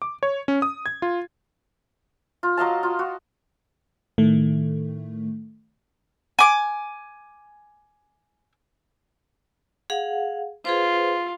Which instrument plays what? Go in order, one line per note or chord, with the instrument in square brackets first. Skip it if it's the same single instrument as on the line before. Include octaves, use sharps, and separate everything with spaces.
[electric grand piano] D6
C#5
C#4
D#6
G#6
F4
[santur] F4
F#3 D#5 F5 A5
F4
F#4
[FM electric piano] A2 D#3 A3
[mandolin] G#5 D6
[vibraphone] G#4 F5 F#5
[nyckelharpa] F4 [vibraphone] G#4 B4 C5